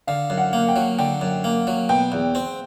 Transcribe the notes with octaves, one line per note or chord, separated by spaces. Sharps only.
D3 F5
F#2
F#5
A#3
G5
F#3
D3 G5
F#2
A#3
F#3
B2 G5
E2
C4